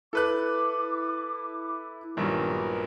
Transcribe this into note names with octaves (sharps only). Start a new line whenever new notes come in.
E4 A4 B4 D6 F#6
A#1 G2 D#3 F#3 B3 G4 A#4